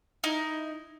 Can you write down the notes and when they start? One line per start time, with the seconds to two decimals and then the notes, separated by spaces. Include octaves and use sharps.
0.24 D#4 E4